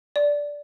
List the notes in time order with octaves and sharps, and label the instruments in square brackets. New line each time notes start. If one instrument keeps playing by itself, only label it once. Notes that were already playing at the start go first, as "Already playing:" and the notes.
[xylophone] D5